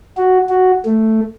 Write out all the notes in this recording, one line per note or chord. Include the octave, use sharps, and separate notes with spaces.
F#4
F#4
A3